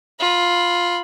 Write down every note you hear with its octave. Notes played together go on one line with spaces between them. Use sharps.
F4 B5